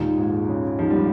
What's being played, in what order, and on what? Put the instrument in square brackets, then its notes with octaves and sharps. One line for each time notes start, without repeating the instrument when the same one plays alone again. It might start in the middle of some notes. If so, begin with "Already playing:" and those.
Already playing: [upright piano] D#2 D#3 G#3 D#4 [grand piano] A#2
[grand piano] G#2
C#3
[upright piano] D#2 D#3 G#3 D#4 [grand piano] F3
[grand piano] G3